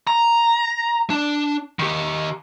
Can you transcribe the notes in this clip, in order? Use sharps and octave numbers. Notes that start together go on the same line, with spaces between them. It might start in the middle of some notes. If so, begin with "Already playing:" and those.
A#5
D4
D#3 G4